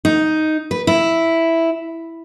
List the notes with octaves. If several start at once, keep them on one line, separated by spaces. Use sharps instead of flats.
D#4
B4
E4